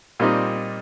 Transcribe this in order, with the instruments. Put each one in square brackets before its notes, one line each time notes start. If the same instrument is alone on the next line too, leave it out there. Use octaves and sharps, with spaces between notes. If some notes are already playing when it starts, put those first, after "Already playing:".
[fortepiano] A#2 G3 C4 D#4